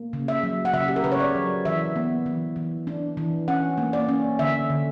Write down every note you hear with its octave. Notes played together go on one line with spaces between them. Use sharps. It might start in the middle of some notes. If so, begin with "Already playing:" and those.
Already playing: A#3
C#3
E5
F#3
F#5
C#3 E5
G4
A#4
C#3 B4
C#5
D5
F#3
E3 E5
B3
E3
E3
D4
E3
C#4 F#5
A#3
D5
C#4
D3 E5
D3